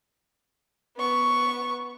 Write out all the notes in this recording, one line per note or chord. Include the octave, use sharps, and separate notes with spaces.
B3 C#6